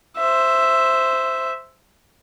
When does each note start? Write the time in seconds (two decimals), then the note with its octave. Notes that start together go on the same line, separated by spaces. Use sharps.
0.17 C5 E5